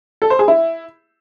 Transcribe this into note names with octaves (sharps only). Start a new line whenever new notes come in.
A4
C5
G#4
E4